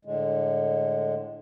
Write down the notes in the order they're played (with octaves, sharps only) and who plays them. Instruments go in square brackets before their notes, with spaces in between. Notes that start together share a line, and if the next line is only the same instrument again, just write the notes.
[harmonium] A2 D3 G#3